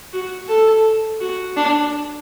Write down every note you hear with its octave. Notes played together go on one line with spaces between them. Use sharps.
F#4
A4
F#4
D4